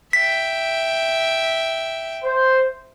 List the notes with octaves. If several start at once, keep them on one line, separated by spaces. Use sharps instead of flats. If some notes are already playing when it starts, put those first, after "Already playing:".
E5 G5 B6
C5